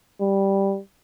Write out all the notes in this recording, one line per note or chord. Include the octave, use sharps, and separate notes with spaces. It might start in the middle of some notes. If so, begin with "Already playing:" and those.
G3